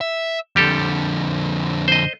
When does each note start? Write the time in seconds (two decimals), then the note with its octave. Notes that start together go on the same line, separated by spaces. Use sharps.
0.01 E5
0.56 F2 D3 G3 G4 A4
1.88 C5 D#5